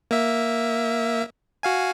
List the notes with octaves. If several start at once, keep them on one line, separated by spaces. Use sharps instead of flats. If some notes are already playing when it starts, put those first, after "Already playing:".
A#3 E5
F#4 F5 G#5